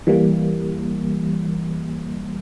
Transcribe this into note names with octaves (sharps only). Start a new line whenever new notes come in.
E3 G3 A#3